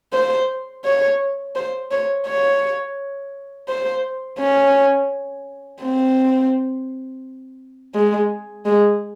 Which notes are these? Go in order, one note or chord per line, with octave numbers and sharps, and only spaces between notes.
C5
C#5
C5
C#5
C#5
C5
C#4
C4
G#3
G#3